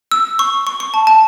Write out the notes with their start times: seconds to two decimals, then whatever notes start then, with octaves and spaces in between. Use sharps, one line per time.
0.12 E6
0.39 C#6
0.67 C#6
0.80 C#6
0.94 A5
1.07 A5